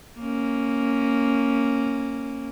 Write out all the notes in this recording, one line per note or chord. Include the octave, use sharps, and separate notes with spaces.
A#3 C#4